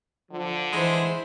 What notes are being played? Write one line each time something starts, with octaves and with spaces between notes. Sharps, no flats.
D3 F3
E3 G#3 E4 C5